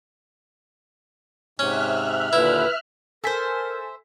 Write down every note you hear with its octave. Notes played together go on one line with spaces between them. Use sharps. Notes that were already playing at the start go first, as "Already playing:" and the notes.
G#2 C3 C#4 E5 F6 F#6
D#2 A#2 D3 E4 B4
A4 A#4 C5 E5 G#5 B6